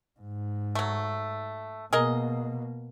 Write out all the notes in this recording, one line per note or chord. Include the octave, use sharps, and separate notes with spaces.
G#2
F#3 A3
B2 A#3 G#4 A#4 D#5